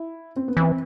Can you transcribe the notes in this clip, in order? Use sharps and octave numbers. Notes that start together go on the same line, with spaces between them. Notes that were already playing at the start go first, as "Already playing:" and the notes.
Already playing: E4
C4
B3
E3 C4